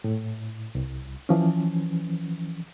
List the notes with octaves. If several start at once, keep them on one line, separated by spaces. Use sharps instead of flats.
A2
C2
E3 F3 C#4